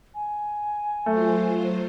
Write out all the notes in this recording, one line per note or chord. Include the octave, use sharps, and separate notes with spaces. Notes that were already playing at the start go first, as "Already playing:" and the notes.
G#5
F#3 A3 F4 C5